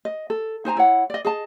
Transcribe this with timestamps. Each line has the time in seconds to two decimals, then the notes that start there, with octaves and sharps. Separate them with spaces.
0.05 D#5
0.30 A4
0.65 D#4 C5 G#5 A#5
0.77 E4 C#5 F#5
1.10 D5 D#5
1.25 G#4 D#5 A5